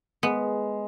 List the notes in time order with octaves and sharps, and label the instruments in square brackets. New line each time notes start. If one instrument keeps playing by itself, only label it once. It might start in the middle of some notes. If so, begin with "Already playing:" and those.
[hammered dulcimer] G#3 [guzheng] B3